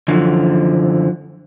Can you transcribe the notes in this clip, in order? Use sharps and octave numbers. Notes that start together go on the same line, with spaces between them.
F#2 D3 E3 F3